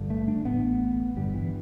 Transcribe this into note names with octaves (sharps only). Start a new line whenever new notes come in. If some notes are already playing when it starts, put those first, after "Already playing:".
Already playing: G1 G2 D3
A3
D4
A1 A2 B3
G1 G2 D3 G3
E3